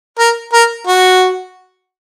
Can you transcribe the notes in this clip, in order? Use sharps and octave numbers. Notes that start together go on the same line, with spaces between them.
A#4
A#4
F#4